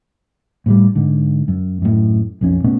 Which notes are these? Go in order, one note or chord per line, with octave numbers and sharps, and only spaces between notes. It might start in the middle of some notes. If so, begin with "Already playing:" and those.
A2 F#3 G3
G#2 D3
F#2
F#2 A2
B1 F2 C#4
B2 A3 B3 C#4